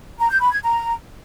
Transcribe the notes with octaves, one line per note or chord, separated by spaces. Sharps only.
A#5
G6
B5
G#6
A#5